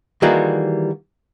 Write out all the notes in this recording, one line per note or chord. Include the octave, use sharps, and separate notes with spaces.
D#3 E3 G3 A#3 F#4 G#4